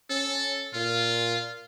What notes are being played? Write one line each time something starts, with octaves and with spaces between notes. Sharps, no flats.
C#4 A4
A#2 F4